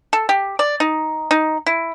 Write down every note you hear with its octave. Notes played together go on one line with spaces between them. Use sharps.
A4
G4
D5
D#4
D#4
E4